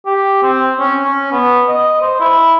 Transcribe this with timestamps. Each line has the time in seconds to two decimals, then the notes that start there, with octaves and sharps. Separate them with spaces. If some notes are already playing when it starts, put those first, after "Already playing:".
0.05 G4
0.43 C4
0.80 C#4
1.03 C#4
1.32 B3
1.69 D#5
2.01 C5
2.20 E4